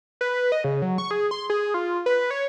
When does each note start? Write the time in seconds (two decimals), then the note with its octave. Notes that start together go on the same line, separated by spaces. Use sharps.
0.21 B4
0.52 D#5
0.64 C#3
0.82 F#3
0.98 C#6
1.11 G#4
1.31 C6
1.50 G#4
1.74 F4
2.06 B4
2.31 C#5